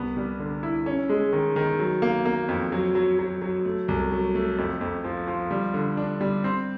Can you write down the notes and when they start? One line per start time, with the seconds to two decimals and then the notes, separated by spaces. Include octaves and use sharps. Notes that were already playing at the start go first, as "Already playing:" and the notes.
Already playing: C2 B3
0.17 G3
0.40 D3
0.63 E4
0.86 C#4
1.09 G#3
1.33 D#3
1.56 D#3
1.79 F#3
2.02 A#3
2.25 A#3
2.49 F2
2.72 F#3
2.95 F#3
3.19 F#3
3.42 F#3
3.65 A3
3.88 C2
4.12 F#3
4.35 A3
4.58 F2
4.81 F2
5.04 F3
5.28 F3
5.51 G3
5.74 D3
5.97 D4
6.21 G3
6.44 C4